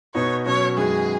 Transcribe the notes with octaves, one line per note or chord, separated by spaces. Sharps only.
B2 B3 D#4 F#4 C#5
B2 F#3 C#4 F#4 C#5
F#2 D#3 G#3 B3 F#4 G#4